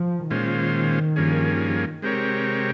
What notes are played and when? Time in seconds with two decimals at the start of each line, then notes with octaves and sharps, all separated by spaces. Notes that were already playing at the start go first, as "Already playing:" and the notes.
Already playing: F3
0.30 A#2 D#3 G#3 C#4 F4 C5
1.16 G2 F3 A#3 C#4 G#4
2.02 C3 G#3 C4 G4 A#4 C#5